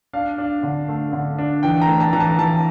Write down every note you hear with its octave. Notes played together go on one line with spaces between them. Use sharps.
D4 F5
D4
D3
A3
D3
D4
E3 G5
A#5
A3
A5
E3 A#5
A5
E3 A5